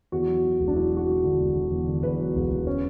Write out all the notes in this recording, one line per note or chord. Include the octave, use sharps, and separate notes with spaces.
E2 F#4
F#3
F#3
E1
D4
F#3 E4
F#3 F#4
F#3
D3
E1
D3
E2
D3
E2 B4
F#3
E1
E1
C#4